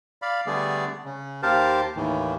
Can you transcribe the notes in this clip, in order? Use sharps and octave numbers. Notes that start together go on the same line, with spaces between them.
D5 F5 B5
D3 G3 A3 B3 G#4 D5
C#3
D#2 G4 A#4 C5 F5 A5
D#2 A2 D#3 E3